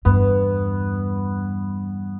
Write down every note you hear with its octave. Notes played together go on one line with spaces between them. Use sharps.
E2 G2 B3